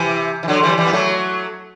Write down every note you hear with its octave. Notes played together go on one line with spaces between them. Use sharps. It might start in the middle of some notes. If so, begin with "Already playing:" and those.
Already playing: C3 E3
E3
D3 F#3
E3 G3
E3 G3
B3
F#3 A3